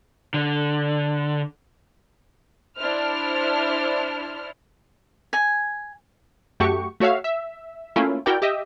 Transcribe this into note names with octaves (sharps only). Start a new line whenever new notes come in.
D3
D4 E4 C5 F6
G#5
F#2 A3 F#4 G4 C#6
A3 F#4 C#5 E5 F5
E5
A3 A#3 C#4 E4 F4
E4 F#4 A#4 D5 G5
G4 D#5 E5